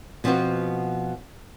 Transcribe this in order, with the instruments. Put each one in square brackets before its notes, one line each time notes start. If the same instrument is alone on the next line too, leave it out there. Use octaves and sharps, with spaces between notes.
[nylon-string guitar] B2 F3 B3 C4 F4 F#4